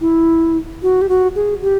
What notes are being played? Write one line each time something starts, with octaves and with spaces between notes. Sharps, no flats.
E4
F#4
G4
F#4
G#4
G4